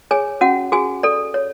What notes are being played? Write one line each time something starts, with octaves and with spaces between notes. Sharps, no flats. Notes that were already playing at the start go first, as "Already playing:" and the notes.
G#4 C#5 G#5
C#4 F#4 F#5
F#4 G#4 G#5
A4 D5
C#5